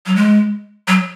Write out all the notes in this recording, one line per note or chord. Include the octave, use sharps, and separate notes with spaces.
F#3
G#3
F#3